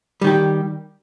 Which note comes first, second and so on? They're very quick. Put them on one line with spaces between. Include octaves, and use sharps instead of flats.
G3 D#3 G4